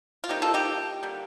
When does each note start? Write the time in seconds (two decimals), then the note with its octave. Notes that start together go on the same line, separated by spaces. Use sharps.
0.24 F4
0.29 C3 G3 A#3 D#4 G4
0.42 F4 A4
0.54 D#4 G4
1.03 D3 G3 A#3